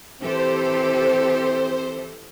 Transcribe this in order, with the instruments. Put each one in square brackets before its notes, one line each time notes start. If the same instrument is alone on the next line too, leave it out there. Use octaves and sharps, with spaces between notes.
[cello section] E3 G4 A4 [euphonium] C4 [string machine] C5